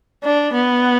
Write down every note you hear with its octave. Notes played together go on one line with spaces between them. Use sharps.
D4
B3